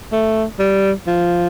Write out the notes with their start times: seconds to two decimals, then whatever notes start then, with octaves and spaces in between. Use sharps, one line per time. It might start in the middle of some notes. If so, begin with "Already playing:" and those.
0.12 A3
0.59 G3
1.07 F3